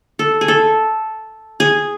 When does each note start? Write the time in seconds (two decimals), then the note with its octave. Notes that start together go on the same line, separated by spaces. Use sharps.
0.19 A4
0.41 G#4
0.48 A4
1.60 G#4